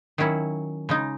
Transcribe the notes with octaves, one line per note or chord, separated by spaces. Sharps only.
D#3 F#3 C#4 E4
C#3 G#3 D#4